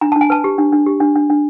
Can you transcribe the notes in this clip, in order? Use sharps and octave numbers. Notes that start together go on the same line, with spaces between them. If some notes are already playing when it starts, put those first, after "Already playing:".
D4 A#5
D4 A5
G#5
B4 A5
G4
D4
D4
G4
D4
D4
D4